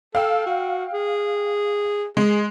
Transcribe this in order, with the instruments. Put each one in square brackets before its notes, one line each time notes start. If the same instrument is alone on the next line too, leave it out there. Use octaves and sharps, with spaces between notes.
[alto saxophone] A4 [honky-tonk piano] F5 G5 E6
[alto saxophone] F#4
G#4
[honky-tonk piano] G#3 [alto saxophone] G#4